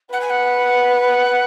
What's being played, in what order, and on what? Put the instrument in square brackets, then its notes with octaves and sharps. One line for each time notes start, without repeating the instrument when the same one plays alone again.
[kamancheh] B4 [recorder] F#5
[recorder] G#5
F#5